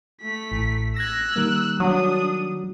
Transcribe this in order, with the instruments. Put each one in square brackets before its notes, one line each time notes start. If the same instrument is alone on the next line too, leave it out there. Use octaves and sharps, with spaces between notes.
[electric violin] A3 B6
[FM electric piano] A1
[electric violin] E6 F#6 [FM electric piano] G#6 A#6
[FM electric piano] D#3 G3 A#3
[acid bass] F#3 [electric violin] D4 D#6